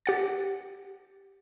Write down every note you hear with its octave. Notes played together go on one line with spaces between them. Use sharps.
G4 F#5 A6